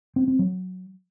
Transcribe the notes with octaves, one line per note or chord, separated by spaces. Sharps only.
C4
C4
F#3